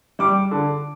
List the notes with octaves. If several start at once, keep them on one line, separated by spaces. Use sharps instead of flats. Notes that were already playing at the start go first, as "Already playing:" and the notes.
G3 D6
D3